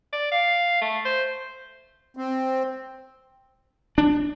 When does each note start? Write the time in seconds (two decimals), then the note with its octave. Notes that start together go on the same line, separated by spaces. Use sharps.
0.13 D5
0.32 F5
0.82 A3
1.05 C5
2.17 C4
3.98 D4